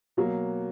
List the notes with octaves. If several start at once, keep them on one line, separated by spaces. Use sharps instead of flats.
B2 F#3 A#3